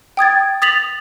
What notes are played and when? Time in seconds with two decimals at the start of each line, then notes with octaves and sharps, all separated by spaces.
0.17 G5 D#6 G#6 A6
0.62 D#6 A6 B6 F7 F#7